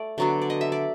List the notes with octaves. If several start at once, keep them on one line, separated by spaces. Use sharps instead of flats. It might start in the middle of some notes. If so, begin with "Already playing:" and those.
Already playing: A3 D5
D3 F#3 B3 D4
D5
D#5
E5
D5